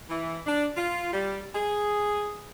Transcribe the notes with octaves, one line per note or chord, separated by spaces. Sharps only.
E3
D4
F4
G3
G#4